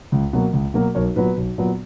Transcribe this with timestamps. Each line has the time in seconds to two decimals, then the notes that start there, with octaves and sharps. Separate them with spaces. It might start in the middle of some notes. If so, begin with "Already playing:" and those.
0.12 C#2
0.33 B2 F#3 A#3
0.53 C#2
0.74 B2 F#3 A#3
0.95 B1 A#4 C#5
1.16 A#2 F#3 B3 B4
1.37 B1
1.58 A#2 F#3 B3